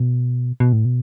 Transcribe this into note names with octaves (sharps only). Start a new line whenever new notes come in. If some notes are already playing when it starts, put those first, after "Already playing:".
Already playing: B2
B2
A2
B2